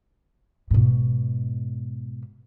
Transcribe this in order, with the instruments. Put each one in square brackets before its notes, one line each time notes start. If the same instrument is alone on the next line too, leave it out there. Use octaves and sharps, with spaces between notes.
[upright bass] G#2 B2